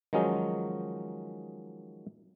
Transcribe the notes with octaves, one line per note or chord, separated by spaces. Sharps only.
D#3 F3 F#3 G#3 C#4 D#4